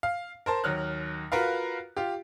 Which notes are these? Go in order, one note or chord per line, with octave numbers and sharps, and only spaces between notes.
F5
A#4 C5 A5
D#2 F#3 F6 F#6
F4 F#4 A#4 B4 F5
F4 G4